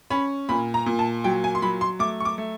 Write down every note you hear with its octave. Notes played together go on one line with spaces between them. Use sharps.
C#4 B5
A#2 B5
A#5
A#2
A5
F#3 G5
G#5
C6
F#3 B5
C6
A3 D6
C#6
D6
A3